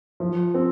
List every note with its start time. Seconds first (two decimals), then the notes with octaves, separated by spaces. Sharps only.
0.20 F3
0.54 C4